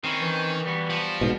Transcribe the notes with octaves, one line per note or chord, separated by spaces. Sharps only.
D#3 C4 C#4 E4
E3
G3 B3 F#4
F3
G#2 B2